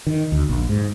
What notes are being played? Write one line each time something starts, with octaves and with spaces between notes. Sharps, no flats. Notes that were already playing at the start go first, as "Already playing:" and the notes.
D#3
D2
A#1
G#2